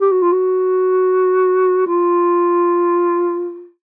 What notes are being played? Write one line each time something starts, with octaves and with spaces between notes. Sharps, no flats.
G4
F#4
F4
F#4
F4